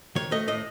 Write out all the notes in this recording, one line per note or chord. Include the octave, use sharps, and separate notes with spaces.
D#3 C#5
A3 D#5
A2 D#5